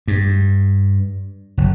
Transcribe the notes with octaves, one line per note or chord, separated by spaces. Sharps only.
G2
F#1